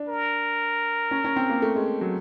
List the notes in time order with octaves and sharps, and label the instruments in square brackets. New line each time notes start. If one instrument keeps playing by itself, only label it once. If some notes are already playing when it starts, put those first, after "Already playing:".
Already playing: [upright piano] D4
[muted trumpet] A#4
[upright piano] C#4
C#4
C4
A#3
A3
G#3
F#3